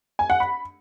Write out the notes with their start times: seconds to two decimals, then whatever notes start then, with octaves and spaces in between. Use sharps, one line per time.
0.19 G#5
0.30 F#5
0.40 B5